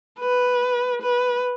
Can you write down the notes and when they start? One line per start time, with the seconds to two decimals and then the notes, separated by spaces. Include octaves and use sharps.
0.19 B4
1.02 B4